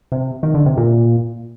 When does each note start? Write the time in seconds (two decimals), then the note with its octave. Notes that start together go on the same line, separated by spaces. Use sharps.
0.12 C3
0.43 D#3
0.54 D3
0.66 C3
0.77 A#2